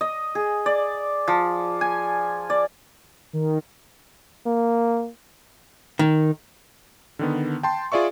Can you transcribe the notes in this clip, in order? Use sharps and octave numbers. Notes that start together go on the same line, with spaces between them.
D#5
G#4
D5
F3
G#5
D5
D#3
A#3
D#3
D3 D#3 B3
G5 A5 C6
F4 G#4 D5 E5 C#6